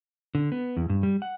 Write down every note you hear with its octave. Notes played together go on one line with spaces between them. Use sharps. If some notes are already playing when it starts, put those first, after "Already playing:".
D3
B3
E2
G2
G3
F#5